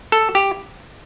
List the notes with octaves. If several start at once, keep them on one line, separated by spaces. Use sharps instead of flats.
A4
G4